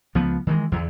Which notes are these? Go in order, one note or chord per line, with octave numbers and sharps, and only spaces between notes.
C#2 F3 B3
D#3 E3 G3 G#3
E2 D3